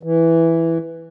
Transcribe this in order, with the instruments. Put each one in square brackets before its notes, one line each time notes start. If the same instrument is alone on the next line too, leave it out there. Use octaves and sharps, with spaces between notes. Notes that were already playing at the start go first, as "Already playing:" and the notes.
[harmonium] E3